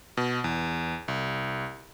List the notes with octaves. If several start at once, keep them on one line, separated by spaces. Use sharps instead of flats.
B2
E2
C2